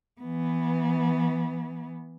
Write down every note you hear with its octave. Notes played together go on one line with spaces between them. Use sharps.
E3 B3